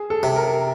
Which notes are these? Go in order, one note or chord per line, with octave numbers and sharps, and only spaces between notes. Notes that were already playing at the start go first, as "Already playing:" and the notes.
Already playing: G#4
A4
C3
A#4